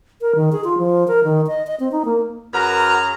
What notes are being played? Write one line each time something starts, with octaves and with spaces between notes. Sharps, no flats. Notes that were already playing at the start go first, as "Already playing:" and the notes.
A#4
D#3
G#4
F4
F3
A#4
D#3
D#5
D#5
C4
D#4
A#3
F#2 F#4 G#4 A#4 B4 A#5 F6